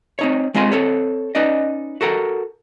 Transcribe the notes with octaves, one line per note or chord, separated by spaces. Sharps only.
C4 D#4 C#5
G#3 C4 F4 D#5 G#5 C6
C4 A4 C#5
C#4 D#4 B4 D5 D#5
F#4 A4 A#4 F#5